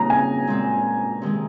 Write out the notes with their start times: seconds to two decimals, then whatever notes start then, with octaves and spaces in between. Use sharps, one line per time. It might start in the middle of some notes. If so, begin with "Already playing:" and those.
Already playing: C#3 G3 A#3 D#4 A#5
0.10 G#5
0.47 A#2 G#3 C4
1.22 C3 D#3 G#3